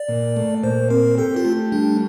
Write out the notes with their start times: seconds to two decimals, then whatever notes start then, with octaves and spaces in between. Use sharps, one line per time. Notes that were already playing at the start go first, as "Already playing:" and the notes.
Already playing: D5
0.09 A#2
0.37 A3
0.63 A#2 C5
0.90 C4 A#4
1.18 G4 A4
1.36 F4
1.45 A3
1.72 G3 D4